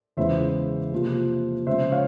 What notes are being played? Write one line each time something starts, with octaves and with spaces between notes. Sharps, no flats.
E2 C#3 E3 G#3 E4 C5 E5
C3 F3 A#3 F4
C#3 F3 G#3 C5 E5
C#5 F5